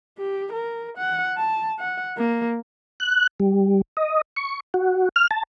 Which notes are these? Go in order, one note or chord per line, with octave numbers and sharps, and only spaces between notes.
G4
A#4
F#5
A5
F#5
A#3
F#6
G3
D#5
C#6
F#4
F6
A5